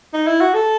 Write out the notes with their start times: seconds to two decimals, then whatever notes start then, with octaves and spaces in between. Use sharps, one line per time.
0.13 D#4
0.27 E4
0.41 F#4
0.54 A4